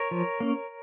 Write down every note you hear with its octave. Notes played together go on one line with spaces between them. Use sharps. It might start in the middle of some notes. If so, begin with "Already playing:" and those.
Already playing: A#4 C#5
F3
A#3 C#4